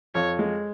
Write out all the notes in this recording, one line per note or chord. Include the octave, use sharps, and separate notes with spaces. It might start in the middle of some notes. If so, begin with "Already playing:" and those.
F2 C#5
G#3